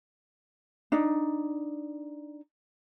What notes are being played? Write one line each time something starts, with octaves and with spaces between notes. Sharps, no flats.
D4 D#4